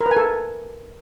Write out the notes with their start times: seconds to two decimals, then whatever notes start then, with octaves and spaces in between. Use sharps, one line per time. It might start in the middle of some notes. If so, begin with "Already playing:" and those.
0.01 A#4
0.06 B4
0.11 G#5
0.17 A4